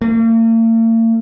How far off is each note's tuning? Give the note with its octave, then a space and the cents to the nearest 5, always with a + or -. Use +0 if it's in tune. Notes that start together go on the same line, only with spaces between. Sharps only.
A#3 -45